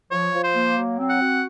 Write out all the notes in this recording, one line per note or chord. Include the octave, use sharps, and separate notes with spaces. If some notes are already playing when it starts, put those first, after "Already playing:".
F3 C#5
F3
C5
A#3
F#3
C4
F#5
F#4